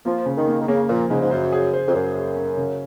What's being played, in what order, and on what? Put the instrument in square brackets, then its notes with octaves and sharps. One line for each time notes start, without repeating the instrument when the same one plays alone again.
[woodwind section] F3 [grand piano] A#3
[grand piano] C#3
[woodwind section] D#3
[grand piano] A#3
[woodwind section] D#3
[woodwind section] C#3 [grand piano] A#3
[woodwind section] A#2 [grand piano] F3
[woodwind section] G#2 [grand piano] C#3
[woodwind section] G#2
[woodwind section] F#2 [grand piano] C5
[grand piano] G#4
C5
[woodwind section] F2
[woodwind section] F#2 [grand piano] C5
[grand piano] G#4
C#4
C#3